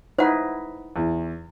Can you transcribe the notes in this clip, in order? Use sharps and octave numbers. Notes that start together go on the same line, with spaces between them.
D#4 E4 B4 C5 F#5
E2